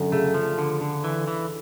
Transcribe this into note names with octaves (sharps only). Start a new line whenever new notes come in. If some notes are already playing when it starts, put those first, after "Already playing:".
Already playing: F#2 D3
C#3 A3
F3
D3
D3
E3
E3